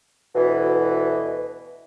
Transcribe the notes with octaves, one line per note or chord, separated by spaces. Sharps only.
D2 B2 E3